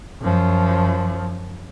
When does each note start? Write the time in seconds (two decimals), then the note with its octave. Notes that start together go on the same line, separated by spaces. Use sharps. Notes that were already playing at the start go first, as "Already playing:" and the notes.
0.21 F#2 F3